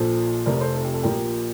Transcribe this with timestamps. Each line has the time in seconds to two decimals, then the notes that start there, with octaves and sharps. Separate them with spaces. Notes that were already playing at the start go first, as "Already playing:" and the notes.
Already playing: A#1 A#2 F3 A4 C5
0.45 F1 F2 C3 F3 A#4 D5
0.60 A4 C5
0.75 A4
0.85 G4
0.94 A4
1.03 A#1 A#2 F3 G4 A#4